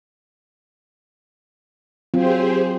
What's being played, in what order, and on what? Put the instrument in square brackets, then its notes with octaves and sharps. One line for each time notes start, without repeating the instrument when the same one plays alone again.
[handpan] F#3 C4 F4 [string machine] G4 G#4 C5